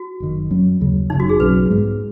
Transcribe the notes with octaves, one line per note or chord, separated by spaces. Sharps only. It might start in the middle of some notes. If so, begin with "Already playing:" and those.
Already playing: F#4
F#1 F#2 D#3
F#2 F#3 C#4
D#2 C#3 F#3
F#1 F#2 C#3 D#4
F#4
G#4
B1 B2 F#3 C#4 B4
G#2 G#3 B3